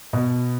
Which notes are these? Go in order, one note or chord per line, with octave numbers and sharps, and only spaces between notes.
B2